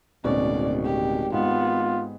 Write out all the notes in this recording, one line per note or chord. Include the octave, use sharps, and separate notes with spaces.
D1 G#1 B2 C#4 D5
G4
G#2 B3 F4